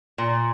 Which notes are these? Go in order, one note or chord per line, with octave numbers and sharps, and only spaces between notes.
A#2